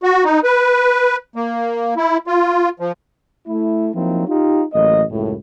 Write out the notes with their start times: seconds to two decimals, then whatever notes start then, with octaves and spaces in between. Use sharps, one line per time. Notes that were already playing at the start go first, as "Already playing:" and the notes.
0.03 F#4
0.25 D#4
0.44 B4
1.36 A#3
1.97 E4
2.27 F4
2.80 F3
3.47 A3 E4
3.94 F3 F#3 A#3 C4 D#4 E4
4.27 D#4 F4 G4
4.74 A1 F#3 A#3 D#5
5.10 C#2 F#2 A2